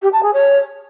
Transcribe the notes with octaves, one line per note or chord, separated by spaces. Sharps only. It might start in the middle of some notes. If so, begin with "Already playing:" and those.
G4
A5
G#4
C#5